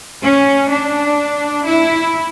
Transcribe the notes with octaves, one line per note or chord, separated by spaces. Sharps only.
C#4
D4
E4